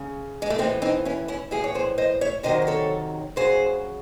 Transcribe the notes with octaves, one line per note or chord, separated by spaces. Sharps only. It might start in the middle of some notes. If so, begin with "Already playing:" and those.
Already playing: C#3
G#3
A3
A2 E3 G#3 C4
C4 D#4
C#4 E4
C#4 E4
A2 E3 E4 G#4
C#5
G#4 C5
C5 D#5
C#5 E5
C3 D#3 F#3 C5 D#5
C5
A4 C#5
C#3 F#3 G#4 C5